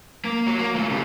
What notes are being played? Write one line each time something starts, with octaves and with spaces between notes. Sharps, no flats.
A#3
F#4 C#5
A#3
A3 F4
C#3 G3